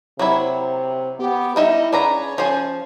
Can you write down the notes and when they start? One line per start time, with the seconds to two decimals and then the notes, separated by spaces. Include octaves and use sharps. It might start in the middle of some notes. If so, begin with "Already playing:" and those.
0.19 C3 F#3 A#3 E4
1.19 B3 G4
1.56 G3 D#4 E4 D#5 E5
1.93 C#3 D4 B4 C#5 A#5
2.38 F3 C#4 G#4 C5